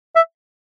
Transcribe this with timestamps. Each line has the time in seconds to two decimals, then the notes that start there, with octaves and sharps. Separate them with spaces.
0.16 E5